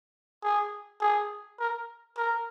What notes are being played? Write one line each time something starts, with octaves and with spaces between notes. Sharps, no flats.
G#4
G#4
A#4
A#4